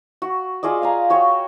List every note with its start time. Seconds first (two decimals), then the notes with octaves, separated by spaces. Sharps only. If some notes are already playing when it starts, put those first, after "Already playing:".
0.22 F#4
0.63 F4 G#4 D5 D#5
0.82 F5 G#5 A#5
1.10 F#4 C#5 G5